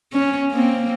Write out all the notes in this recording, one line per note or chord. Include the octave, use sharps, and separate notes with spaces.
C#4
A#3 C4